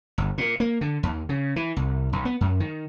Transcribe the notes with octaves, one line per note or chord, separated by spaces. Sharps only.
G1
A#2
A#3
D3
D#2
C#3
E3
C2
B1
B3
F#2
D#3